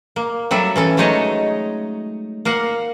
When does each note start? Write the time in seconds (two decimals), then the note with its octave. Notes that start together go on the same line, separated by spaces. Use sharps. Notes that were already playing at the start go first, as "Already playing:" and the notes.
0.16 A#3
0.51 F#3 G3 A4 E5
0.76 E3 C#4 A4
0.97 F#3 G#3 A3 D#4 C#5 D#5
2.45 A#3 A#4 F5 F#5